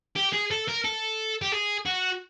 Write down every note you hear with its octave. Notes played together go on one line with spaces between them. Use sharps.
G4
G#4
A4
A#4
A4
G4
G#4
F#4